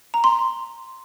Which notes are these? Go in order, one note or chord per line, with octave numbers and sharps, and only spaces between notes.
A#5
C6